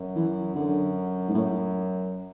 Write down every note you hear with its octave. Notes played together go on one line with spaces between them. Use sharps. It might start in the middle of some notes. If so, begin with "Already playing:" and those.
Already playing: F#2
E3
F#2 D3
G#2
F#2 A2